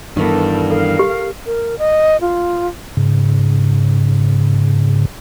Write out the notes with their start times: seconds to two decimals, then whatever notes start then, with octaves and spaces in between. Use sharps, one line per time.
0.17 G2 D#3 E3 B3 A4 A#4
0.70 A4 A#4 F5
0.99 G4
1.46 A#4
1.79 D#5
2.21 F4
2.97 G#2 C#3